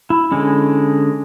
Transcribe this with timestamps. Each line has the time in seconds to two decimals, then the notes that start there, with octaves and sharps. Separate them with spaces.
0.10 E4
0.32 D3 G#3 C#4